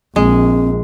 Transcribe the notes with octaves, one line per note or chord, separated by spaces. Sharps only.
A#1 G#3 C4